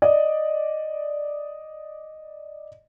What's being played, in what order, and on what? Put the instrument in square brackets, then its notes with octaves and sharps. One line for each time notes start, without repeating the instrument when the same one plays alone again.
[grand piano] D5 D#5